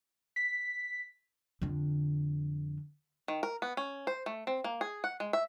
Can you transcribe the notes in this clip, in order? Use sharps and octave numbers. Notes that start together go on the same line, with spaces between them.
B6
F2 D3
D#3
A#4
B3
C#4
C5
A3
C4
A#3
G#4
F#5
G#3
E5